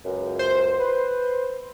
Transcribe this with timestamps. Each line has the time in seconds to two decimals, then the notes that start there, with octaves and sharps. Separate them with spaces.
0.06 C#2 F#2
0.39 C5
0.80 B4